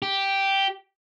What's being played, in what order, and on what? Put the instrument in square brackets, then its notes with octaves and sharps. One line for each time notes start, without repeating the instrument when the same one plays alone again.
[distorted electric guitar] G4